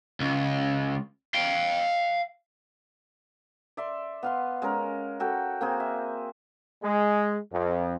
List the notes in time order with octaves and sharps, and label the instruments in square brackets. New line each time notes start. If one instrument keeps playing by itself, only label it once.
[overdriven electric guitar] C#2
F5 G5
[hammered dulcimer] D5 E5 C6
B3 F5 C6
G#3 C#4 A#4
F#4 A4 G5
A#3 C4 G#4
E5
[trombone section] G#3
F2